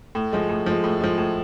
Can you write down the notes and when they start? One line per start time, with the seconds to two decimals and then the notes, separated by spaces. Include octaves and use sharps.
0.15 A2
0.33 F3 G#3
0.49 A2
0.66 F3 G#3
0.84 A2
1.00 F3 G#3
1.18 A2